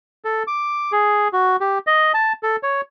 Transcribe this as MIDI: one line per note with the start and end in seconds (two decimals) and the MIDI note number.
0.25 0.43 69
0.47 0.92 86
0.92 1.28 68
1.33 1.56 66
1.61 1.79 67
1.87 2.12 75
2.14 2.33 81
2.43 2.56 69
2.63 2.81 73